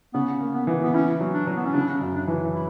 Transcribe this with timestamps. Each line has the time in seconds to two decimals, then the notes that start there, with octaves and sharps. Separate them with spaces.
0.14 C#3 B3
0.40 A#3
0.54 B3
0.67 E3
0.84 B3
0.94 C#4 E4
1.21 F#3
1.34 D4
1.47 F#3
1.56 B3
1.65 C#4
1.74 C#3 D4
2.01 F#2
2.14 D4
2.28 E3
2.55 E4